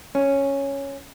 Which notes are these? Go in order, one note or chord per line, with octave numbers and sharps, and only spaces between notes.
C#4